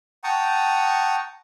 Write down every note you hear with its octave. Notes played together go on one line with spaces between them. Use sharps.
F#5 G5 A5 A#5 C#6 D#6